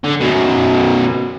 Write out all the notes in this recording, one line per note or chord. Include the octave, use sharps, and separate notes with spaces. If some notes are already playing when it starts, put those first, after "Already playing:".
D3
F#2 B2